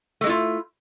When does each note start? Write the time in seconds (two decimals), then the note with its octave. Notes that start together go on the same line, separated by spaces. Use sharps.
0.21 A3
0.24 G#3
0.27 E4
0.29 F4